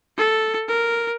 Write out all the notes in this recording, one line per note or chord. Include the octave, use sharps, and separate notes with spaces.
A4
A#4